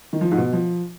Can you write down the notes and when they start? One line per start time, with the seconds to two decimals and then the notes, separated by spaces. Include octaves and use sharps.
0.13 D#3
0.21 F3
0.31 G#2
0.37 B2
0.53 F3